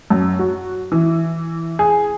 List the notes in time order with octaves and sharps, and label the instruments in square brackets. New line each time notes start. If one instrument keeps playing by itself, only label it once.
[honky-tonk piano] F#2
F#4
E3
G#4